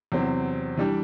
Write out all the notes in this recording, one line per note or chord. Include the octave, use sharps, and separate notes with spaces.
E2 C3 F#3 C4
E3 G3 D4 G4